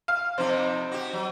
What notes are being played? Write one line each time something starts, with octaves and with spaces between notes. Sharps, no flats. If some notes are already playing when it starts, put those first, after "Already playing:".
F5
F2 C3 C4 D#4
F#4 G4
F#3